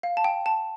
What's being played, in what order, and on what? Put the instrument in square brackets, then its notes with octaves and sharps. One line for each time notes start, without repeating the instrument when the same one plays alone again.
[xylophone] F5
A5
G5
A5